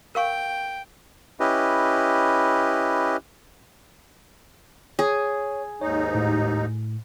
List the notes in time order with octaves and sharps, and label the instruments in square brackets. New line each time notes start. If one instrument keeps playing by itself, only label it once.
[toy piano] A#4 F5 C#6 [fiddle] G5
[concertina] C#4 E4 G4 B4 D#5
[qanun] G#4 [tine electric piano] C#5
[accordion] D#2 G#2 D#4 [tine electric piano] C#5
[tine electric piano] A2